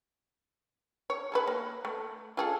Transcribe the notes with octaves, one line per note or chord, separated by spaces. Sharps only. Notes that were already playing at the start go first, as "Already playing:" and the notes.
C#5
G#4 A4 B4
A#3
A3
F4 G#4 A4